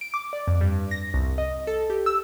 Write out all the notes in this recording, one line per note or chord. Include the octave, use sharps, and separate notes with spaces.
D7
D6
D5
F2
G2
A#6
C2
D#5
A4
G4
E6